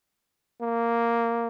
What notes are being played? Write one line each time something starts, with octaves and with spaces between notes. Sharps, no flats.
A#3